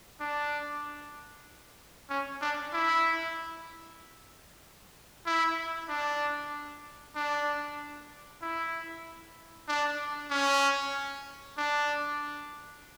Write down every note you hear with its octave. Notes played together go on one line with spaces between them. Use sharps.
D4
C#4
D4
E4
E4
D4
D4
E4
D4
C#4
D4